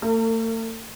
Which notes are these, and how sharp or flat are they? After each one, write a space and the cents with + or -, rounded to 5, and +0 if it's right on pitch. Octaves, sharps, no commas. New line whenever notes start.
A3 +45 A#4 -40